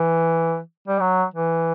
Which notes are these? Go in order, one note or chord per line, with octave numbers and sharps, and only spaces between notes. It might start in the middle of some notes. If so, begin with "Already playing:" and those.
Already playing: E3
G3
F#3
E3